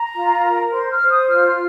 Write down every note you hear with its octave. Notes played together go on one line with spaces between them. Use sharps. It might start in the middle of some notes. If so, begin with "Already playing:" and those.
Already playing: A#5
F4
A#4
C5 C6
F6
C5
D#6
F4 F6